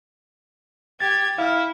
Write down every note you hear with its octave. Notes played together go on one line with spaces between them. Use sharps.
G4 G#6 A6
E4 F5 F6